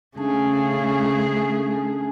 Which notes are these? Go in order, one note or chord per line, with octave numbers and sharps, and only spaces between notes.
C#3 A3 C#4 D4 G#4